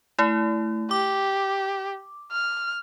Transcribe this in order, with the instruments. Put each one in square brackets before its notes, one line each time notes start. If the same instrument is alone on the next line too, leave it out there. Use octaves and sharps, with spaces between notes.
[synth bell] A3 E4
[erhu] G4 [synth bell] D6
[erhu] F6